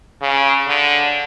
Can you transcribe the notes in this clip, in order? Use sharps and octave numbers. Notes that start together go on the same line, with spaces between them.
C#3
D3